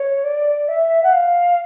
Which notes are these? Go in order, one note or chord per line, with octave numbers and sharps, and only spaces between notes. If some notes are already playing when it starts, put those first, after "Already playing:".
Already playing: C#5
D5
E5
F#5
F5